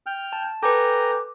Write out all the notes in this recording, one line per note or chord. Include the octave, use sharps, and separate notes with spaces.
G5 F6
A5
A4 B4 G5 G#5 A#5 D6